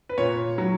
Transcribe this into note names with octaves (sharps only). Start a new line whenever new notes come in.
B4
A#2 C#5
F#3